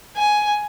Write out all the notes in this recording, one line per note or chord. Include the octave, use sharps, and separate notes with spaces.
G#5